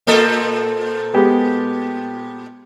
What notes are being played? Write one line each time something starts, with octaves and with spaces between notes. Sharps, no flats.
A#2 A#3 C4 A4
G#3 B3 G4